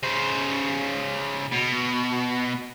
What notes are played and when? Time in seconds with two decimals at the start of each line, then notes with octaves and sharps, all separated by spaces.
0.03 C#3 C5
1.52 B2